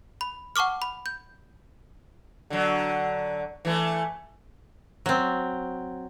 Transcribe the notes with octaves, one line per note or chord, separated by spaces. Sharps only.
B5
F#5 A5 C#6 D6 F6
B5
G6
D3 F#3
E3 A3
F#3 C4